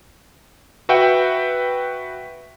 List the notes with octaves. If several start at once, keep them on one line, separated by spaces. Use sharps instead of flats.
F#4 B4 E5 F#5 G5